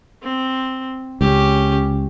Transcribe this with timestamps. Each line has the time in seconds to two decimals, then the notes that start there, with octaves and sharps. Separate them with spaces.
0.23 C4
1.21 C#2 C#4 G4